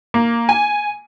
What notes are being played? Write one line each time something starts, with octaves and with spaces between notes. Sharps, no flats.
A#3
G#5